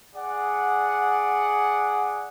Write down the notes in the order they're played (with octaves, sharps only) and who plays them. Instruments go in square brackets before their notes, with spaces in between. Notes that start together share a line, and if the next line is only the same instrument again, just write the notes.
[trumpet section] G#4 D5 F#5